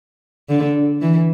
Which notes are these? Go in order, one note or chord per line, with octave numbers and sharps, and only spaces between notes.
D3
E3